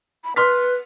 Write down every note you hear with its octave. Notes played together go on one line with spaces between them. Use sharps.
B5
B4 C6 F6 B6